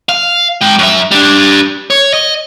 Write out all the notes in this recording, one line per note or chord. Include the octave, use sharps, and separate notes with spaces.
F5
G#3 G5
F#2 E5
G3 D4
C#5
D#5